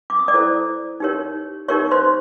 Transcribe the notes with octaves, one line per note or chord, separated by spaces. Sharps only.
D6
D#6
D5 D6
E4 A4 C5
D#4 G4 A#4 C#5
D#4 G4 A#4 C#5 C#6
C5 C6